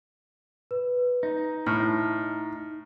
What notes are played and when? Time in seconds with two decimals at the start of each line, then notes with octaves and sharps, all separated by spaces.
0.71 B4
1.23 D#4
1.67 A2 F6